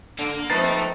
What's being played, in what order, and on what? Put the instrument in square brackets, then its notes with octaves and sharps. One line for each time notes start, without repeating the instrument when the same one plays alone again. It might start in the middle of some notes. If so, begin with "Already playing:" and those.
[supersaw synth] D3 [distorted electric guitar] A#3
[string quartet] F3 A3 C4 [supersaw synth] D#4 B4 [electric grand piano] A6 C7